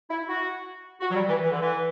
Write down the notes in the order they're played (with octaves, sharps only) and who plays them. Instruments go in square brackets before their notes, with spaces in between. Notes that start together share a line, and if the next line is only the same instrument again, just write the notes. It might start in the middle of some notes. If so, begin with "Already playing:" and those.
[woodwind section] E4
F#4
F#4
F#3
G3
E3
E3
D3
E3